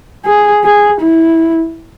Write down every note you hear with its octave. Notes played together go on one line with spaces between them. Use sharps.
G#4
G#4
E4